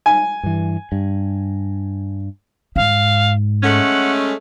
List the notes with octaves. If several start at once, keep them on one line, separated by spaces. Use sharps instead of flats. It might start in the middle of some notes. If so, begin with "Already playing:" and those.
G#5
G2 E3
G2
G#2 F5
G#3 A3 C#4 F#5